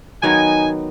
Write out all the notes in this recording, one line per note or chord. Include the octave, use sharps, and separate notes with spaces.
D#3 F#3 B3 D#4 G#5